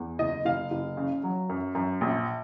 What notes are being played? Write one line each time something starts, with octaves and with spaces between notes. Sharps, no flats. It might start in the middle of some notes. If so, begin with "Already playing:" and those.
Already playing: E2
F#1 D#5
F#1 F5
F#1
C#3
F#3
F#2
F#2
A#1